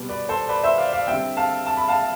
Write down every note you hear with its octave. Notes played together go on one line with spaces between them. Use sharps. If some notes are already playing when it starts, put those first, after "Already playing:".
Already playing: B2 G3 B3
B4 D5
A4 C5
B4 D5
C5 E5
D5 F5
D5 F5
D3 G3 C4 E5 G5
F5 A5
A5
B5
F5 A5